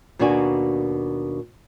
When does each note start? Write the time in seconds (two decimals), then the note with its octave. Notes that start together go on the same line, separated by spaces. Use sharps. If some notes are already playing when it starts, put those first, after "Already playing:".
0.19 D#2 B2 A#3 D4 F#4 G#5